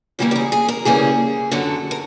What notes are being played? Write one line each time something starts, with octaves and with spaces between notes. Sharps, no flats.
C#3 E3 G3 A#3 C#4 G4
G4
G#4
G#4
A#4
C#3 E3 G3 A#3 C#4 G#4
F#2 D3 F#3 A4
A#4